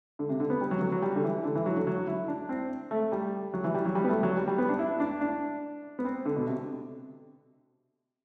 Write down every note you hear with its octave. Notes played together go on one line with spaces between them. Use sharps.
D3
C3
D3
B3
G3
F#3
F#3
F#3
G3
D3
E3
D3
E3
F#3
D3
F#3
E4
D4
C4
A3
G3
F#3
E3
G3
F#3
G3
B3
A3
F#3
G3
G3
B3
D4
E4
D4
D4
B3
C4
D3
B2
C3